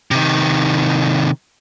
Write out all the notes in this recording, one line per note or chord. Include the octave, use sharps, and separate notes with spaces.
C3 D#3